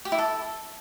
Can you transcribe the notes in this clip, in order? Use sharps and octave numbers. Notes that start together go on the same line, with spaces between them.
G4
E4
A4